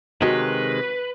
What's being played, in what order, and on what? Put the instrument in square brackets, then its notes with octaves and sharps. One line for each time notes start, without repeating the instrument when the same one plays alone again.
[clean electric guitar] C3 D#3 G#3 [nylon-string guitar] C#4 F#4 [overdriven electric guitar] B4